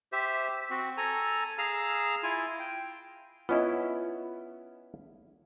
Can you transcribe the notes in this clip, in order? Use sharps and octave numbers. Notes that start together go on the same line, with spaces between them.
G4 C5 E5
C4 F#4
A4 G#5 A#5
G#4 F5 A#5 E6 F6
E4 F4 G#5
G5
B3 C#4 E4 F4 D#5